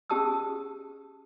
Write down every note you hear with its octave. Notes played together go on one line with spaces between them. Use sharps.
C#4 G4 G#4 A5 D#6 E6